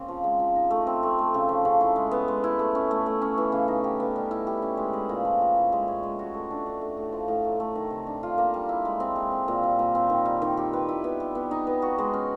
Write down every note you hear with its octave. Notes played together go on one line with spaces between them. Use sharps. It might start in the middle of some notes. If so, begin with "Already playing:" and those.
Already playing: C#3 A#3 C4
F3
G#3
F3
D#4
A3
C4
A3
A3
C#3
F3
C#3
E4
G#3
B3
G#3
E4
A3
C#4
A3
A3
C#4
E3
C#3
D#4
G4
B3
G3
E4
G4
C#4
G#3
G#3
A#2
F3
A#2
E4
G#3
C#4
G#3
F#4
A3
D4
A3
A3
A2
F3
A2
F#3
A3
D#3
C3
D4
F4
A#3
G3
E4
G#3
C4
G#3
C4
A#2
G3
A#2
C4
D#3
G3
D#3
G4
B4
E4
B3
G4
B3
D#4
B3
F#4
G#3
C#4